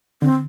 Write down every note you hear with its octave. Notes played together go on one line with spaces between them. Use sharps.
D3 C4